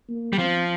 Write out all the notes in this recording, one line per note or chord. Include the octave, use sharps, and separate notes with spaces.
A#3
G3
F3 C4